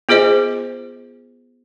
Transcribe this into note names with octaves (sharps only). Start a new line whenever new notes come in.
B3 F4 G#4 C5 D#5